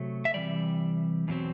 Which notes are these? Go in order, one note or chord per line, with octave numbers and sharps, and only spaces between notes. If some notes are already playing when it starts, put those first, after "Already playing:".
Already playing: C3 F#3 A3
E5
C3 E3 G3 D5
E2 B2 F#3 C4